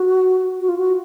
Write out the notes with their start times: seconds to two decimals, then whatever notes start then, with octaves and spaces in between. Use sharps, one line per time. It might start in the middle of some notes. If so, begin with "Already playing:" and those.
Already playing: F#4
0.60 F#4
0.69 F4
0.78 F#4